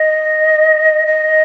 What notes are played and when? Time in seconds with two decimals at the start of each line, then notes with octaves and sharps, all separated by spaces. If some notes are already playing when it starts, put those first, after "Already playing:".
Already playing: D#5
1.06 D#5